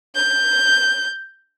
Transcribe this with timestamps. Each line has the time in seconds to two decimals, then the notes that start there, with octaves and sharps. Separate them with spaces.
0.15 G6